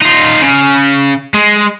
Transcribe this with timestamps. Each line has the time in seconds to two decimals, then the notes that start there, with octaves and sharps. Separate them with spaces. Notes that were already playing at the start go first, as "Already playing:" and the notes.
0.02 D#4 F4
0.42 C#3
1.35 G#3